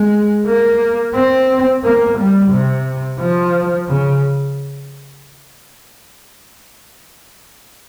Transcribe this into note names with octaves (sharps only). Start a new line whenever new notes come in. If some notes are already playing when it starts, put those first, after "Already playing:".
Already playing: G#3
A#3
C4
A#3
G3
C3
F3
C#3